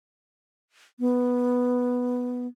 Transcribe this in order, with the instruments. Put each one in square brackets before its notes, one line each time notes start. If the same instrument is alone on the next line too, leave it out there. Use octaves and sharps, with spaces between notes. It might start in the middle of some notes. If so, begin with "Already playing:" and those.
[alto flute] B3